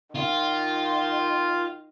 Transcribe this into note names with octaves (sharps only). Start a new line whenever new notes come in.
D#3 F4